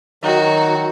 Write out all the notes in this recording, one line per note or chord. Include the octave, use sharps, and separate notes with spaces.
D#3 F#3 D#4 F#4